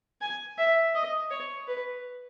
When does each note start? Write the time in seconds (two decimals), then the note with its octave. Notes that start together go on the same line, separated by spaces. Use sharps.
0.21 G#5
0.58 E5
0.95 D#5
1.31 C#5
1.68 B4